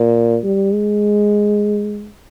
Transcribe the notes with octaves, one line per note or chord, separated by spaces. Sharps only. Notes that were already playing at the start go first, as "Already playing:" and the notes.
Already playing: A#2
G3
G#3